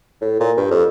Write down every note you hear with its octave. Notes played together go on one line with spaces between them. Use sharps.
A2
A#2
G2
F2